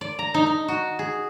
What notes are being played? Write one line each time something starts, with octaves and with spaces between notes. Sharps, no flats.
D5
A#5
D#4
D#4
F#4
G#4